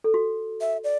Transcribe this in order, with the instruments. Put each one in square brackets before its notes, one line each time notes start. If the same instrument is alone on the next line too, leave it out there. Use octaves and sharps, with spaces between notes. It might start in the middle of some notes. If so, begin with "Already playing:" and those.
[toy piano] A4
F#4
[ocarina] E5
D5